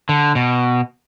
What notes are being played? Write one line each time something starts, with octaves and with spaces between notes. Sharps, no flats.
D3
B2